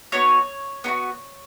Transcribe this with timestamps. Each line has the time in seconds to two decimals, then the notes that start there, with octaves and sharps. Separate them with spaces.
0.12 B3 D#4 F#4 C#5
0.84 B3 D#4 F#4